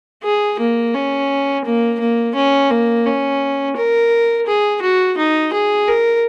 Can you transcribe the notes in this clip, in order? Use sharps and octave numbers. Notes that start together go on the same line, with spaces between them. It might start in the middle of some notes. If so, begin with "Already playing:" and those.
G#4
A#3
C#4
A#3
A#3
C#4
A#3
C#4
A#4
G#4
F#4
D#4
G#4
A#4